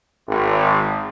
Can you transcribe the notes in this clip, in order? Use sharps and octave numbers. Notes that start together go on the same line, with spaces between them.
G#1